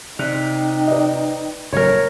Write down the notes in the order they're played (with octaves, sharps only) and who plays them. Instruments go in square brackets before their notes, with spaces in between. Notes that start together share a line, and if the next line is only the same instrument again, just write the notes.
[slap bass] C3 [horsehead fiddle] D#4 G5 [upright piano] D5 F#6 F7
[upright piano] B4 D5 D#5
[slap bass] F#1 A2 [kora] A#4 C#5